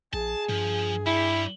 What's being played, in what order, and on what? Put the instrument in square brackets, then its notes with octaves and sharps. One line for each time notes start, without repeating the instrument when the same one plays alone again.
[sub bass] A#1 [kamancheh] G#4 [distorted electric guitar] A5
[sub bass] G2 [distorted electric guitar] F3
[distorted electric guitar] G3 [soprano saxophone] E4